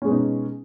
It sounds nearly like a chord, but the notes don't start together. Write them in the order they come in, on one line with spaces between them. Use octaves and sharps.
C#4 G#3 B2 D#4